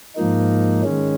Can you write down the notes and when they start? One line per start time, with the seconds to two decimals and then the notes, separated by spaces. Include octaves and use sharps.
0.16 G#2 F3 A#3 D#4
0.83 D#3 G#3 C#4